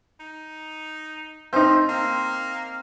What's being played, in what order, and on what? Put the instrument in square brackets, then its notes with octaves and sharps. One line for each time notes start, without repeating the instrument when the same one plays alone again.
[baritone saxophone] D#4
[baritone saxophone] F3 [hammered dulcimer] C4 [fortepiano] D#4 C5
[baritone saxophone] A#3